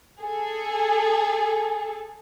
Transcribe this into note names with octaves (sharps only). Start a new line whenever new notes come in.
G#4 A4